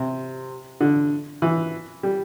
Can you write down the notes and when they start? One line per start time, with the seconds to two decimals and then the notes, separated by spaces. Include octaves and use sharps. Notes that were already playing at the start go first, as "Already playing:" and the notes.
Already playing: C3
0.81 D3
1.42 E3
2.03 G3